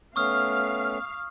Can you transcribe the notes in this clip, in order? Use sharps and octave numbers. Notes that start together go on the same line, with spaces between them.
A3 B3 C#4 F5 C#6 D#6 F6